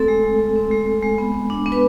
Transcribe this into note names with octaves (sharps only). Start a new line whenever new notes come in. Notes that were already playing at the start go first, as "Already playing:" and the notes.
Already playing: A3 C4 A4
G#3
G#3
G#3
C4
G#3
G#3
G#3
B3
B3
D4
B3
B4